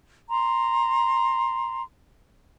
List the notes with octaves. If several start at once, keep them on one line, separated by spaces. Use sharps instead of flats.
A#5 C6